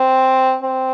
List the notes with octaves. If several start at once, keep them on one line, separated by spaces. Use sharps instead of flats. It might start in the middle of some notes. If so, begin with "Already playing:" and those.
Already playing: C4
C4